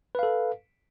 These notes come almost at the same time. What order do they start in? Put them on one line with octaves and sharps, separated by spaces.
B4 F5 A4